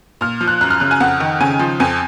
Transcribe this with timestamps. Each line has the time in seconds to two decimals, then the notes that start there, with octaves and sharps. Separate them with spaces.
0.21 A#2 F6
0.41 F3
0.48 F#6
0.61 F#2 F#6
0.70 F6
0.80 C#3 F#6
0.91 G#5
1.00 F2 F#5
1.20 D#3
1.40 C#3 G#5
1.59 F3
1.80 F2 G#5